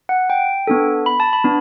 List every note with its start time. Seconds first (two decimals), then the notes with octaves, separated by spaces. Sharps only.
0.09 F#5
0.30 G5
0.67 B3 D4 A4
1.06 B5
1.20 A5
1.33 B5
1.44 B3 D4